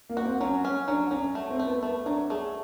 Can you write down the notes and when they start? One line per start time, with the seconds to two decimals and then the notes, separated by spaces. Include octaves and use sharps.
0.09 A#3
0.17 F#4
0.25 C4
0.40 F#3 C#4
0.65 C#4
0.88 F#3 D4
1.11 F#3 C#4
1.35 A3
1.50 C4
1.59 A3
1.66 B3
1.83 A3 B3
2.06 F#3 D4
2.30 A3 G#4